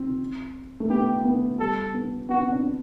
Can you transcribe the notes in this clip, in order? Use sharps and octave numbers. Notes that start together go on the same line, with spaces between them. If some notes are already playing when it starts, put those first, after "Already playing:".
Already playing: C4
A3
B3 G4
B3
G3 A4
B3
B3 F#4
C4
D4